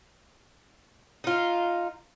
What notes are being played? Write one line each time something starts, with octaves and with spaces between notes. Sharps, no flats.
D#4 F4